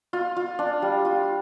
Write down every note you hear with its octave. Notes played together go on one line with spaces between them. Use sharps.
F4
F4
D4
G3
F4